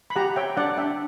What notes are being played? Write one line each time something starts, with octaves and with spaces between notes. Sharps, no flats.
B5
G4 F#5 A#5
C#5 E5 G5
D4 D5 F#5
D4 E5 G5